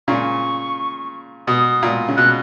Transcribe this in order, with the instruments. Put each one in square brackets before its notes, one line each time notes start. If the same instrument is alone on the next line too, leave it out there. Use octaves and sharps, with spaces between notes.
[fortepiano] A#2 C#3 [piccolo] C#6
[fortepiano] B2 [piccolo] D#6
[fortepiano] A#2
C#3
[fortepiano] B2 [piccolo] F#6